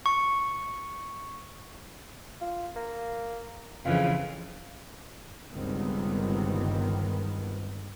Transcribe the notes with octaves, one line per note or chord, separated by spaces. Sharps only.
C#6
F4
A#3
F2 C#3 E3 F4
G1 C#2 G2 D#3 B3 C4